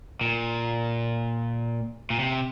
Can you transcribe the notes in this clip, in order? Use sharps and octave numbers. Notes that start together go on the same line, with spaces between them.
A#2
A#2
C3